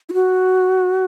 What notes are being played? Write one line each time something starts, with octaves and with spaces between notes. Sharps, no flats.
E4
F#4